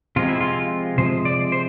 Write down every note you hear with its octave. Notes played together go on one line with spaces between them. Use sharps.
C3 F3 G#3 F4
E4
F4
C3 F3 G#3 C5
D5
C5